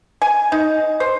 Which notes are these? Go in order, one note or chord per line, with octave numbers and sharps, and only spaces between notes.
G#5
D#4
C5